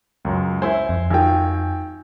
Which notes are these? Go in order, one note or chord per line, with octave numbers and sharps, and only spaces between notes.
C#2 F#2
E4 C5 G#5
F2
G#1 F4 G5 G#5